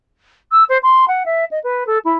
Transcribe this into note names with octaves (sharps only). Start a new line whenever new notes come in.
E6
C5
C6
F#5
E5
D#5
B4
A4
E4